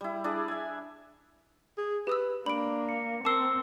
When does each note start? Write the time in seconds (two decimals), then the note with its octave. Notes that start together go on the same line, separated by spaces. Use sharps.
0.01 G3 E4
0.24 D4 E4 G#4 D5
0.48 E5 G#5
1.78 G#4
2.07 G4 B4 D#6 E6
2.46 A#3 D4 B5 D7
2.89 C#7
3.25 C4 A#4 A5 D6 E6 C7 G7